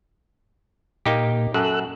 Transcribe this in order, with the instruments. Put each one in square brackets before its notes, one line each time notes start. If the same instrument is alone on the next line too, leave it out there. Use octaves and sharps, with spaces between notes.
[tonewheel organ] A#2 [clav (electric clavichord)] A#3 D#4 G4
[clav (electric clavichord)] F#2 [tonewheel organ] A4 E6 F#6